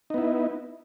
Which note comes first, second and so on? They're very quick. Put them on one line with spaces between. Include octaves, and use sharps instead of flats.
D#4 B3 E4